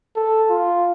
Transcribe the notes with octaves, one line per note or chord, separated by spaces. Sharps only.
A4
F4